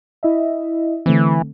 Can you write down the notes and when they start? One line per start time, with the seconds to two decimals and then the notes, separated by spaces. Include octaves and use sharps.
0.23 E4 D#5 E5
1.06 D3 E3 A3 C4